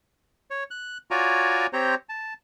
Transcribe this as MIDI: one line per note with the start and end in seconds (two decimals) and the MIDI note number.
0.50 0.64 73
0.71 0.98 90
1.11 1.67 65
1.11 1.67 66
1.11 1.67 73
1.11 1.67 74
1.11 1.67 80
1.11 1.67 82
1.73 1.95 60
1.73 1.95 67
1.73 1.95 72
1.73 1.95 73
1.73 1.95 82
2.09 2.34 81